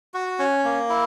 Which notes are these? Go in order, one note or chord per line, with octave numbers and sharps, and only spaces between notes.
F#4
C#4
A#3
E4